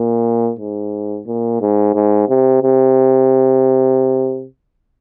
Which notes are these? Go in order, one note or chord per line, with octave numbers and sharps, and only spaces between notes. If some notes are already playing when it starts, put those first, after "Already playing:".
Already playing: A#2
G#2
A#2
G#2
G#2
C3
C3